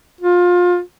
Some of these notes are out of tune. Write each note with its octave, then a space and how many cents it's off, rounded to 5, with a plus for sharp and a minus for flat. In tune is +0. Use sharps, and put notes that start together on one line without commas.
F4 +25